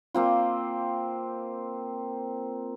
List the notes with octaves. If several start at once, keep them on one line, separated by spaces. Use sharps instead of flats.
A#3 C4 F4